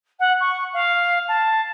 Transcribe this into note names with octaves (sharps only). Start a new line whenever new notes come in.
F#5
C#6
F5
A5